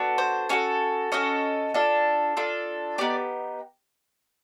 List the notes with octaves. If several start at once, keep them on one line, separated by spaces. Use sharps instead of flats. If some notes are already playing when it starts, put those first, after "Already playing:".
Already playing: B3 D4 F#4 A4
C5
C#4 F#4 A4 C#5
C#4 F#4 A4 D#5
D4 F4 A4
D4 F4 A4
B3 D#4 G4 D5